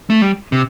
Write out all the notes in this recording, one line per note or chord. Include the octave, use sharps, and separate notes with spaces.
A3
G3
C3